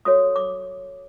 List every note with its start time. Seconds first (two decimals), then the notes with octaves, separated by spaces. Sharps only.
0.05 F#4 A4 C#5 D#6
0.36 D6